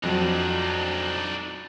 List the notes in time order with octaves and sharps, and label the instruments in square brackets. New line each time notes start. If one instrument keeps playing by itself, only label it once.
[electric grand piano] F2 F#3 [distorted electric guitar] D4 D#4